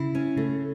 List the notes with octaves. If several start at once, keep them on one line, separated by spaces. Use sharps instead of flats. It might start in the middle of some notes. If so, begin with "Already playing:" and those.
Already playing: C#3 E4
C#4
C#3 A3